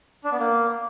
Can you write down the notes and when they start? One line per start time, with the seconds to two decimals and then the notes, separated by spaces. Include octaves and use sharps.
0.24 D4
0.32 B3
0.40 A#3